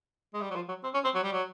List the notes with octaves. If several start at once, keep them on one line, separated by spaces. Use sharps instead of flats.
G#3
G3
F#3
F3
F#3
C4
C#4
C4
F#3
G3
F#3